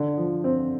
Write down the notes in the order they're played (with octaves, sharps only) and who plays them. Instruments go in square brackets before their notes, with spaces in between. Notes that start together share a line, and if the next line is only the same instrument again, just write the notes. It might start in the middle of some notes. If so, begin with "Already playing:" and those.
Already playing: [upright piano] D3
F3
C4